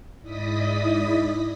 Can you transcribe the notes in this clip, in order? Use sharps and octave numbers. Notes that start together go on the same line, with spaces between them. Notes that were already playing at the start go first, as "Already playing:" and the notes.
G#2 E4 D5 D#5 D#6 B6